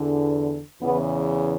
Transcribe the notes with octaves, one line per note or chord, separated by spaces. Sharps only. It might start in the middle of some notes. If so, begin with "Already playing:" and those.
Already playing: E2 D3
E2 C#3 E3 B3